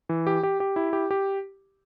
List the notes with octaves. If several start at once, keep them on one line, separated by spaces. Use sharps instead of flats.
E3
G4
G4
G4
E4
G4
G4